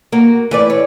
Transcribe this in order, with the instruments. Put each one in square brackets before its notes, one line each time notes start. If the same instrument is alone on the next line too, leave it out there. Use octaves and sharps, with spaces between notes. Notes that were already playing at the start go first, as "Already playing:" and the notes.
[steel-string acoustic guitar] A#3 [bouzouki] F#4
[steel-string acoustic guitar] A2 [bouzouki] E3 B4 D5
[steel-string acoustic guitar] C#5